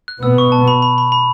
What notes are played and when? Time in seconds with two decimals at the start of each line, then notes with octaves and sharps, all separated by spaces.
0.08 F#6
0.23 B2 B3 E6
0.38 C#6
0.52 A5
0.68 B5
0.82 B5
0.98 B5
1.12 B5